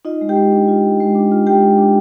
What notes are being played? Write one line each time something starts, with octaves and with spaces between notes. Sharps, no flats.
D#4 F4 D#5
G#3
G4 G5
G#3
D4
F4
G#3
G#3
D4
F4
G#3 G4 G5
G#3
D4